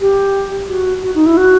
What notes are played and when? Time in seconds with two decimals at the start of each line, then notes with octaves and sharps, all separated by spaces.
0.01 G4
0.69 F#4
1.03 F#4
1.15 D#4
1.26 E4
1.37 F#4